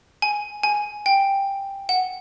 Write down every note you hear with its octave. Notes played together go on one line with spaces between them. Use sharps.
G#5
G#5
G5
F#5